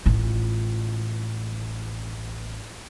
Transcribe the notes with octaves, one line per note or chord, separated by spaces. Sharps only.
A1 F4